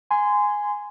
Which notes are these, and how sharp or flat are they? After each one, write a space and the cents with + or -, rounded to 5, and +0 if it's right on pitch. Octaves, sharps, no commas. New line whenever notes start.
G#5 +0 C6 -25